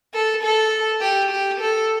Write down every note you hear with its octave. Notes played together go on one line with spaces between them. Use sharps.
A4
A4
G4
G4
A4